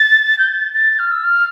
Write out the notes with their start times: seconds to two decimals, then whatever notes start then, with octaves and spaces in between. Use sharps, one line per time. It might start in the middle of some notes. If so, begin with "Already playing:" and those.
Already playing: A6
0.38 G6
0.49 A6
0.74 A6
0.99 F6
1.12 E6
1.24 F6